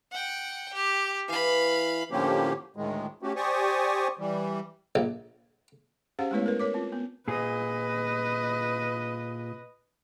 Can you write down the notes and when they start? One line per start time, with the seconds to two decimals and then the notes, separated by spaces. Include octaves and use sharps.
0.11 F#5 G5
0.74 G4
1.28 E3 F5 B5
2.11 A2 D3 F3 A#3 C#4 G4
2.76 D2 A2 D#3 G#3
3.22 A3 C#4 F#4 G4
3.36 G4 C5 D5 G#5 C#6 D#6
4.19 E3 G3
4.95 A#1
6.19 C#4 G4 G#4 C5 F5 F#5
6.31 G#3 A3 B3 E4 B4 C#5
6.46 A#4 B4
6.59 A#4 C#5 D6
6.74 C4 F4
6.92 B3
7.28 A#2 G#4 B4 D#5